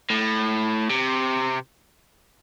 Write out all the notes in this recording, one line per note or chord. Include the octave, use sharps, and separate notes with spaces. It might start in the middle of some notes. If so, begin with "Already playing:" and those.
A2
C3